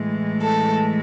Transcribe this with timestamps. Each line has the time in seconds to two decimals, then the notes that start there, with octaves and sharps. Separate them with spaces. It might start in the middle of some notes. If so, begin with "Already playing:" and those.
Already playing: A2 E3 G#3
0.41 A4